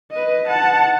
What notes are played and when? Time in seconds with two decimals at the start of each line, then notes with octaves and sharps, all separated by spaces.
0.12 B4 D#5
0.47 F#5 A5